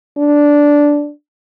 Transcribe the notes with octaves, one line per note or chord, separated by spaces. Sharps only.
D4